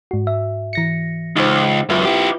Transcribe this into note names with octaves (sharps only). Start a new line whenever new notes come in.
G#2 F#4
E5
E3 A#6 C#7
C#2 D#4 C5
C#2 F#2 F4 B4 E5
E4 G4